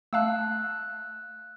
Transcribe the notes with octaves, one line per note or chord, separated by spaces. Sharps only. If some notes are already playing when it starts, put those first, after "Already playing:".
A3 F5 A5 E6 F#6